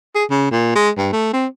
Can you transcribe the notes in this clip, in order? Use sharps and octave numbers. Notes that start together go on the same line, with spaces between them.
G#4
C#3
A#2
G#3
G2
A3
C4